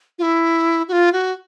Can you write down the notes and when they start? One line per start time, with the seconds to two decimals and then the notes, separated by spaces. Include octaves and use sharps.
0.19 F4
0.23 E4
0.88 F#4
0.93 F4
1.13 F#4